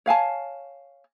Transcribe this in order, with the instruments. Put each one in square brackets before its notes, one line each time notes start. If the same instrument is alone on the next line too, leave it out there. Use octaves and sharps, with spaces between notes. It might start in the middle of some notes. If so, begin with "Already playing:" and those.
[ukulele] C#5 F5 G#5 A5